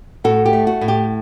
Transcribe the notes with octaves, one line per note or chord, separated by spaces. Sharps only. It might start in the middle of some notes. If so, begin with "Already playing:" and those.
A2 F#4 A4
G4
A3
F#4
A2
G4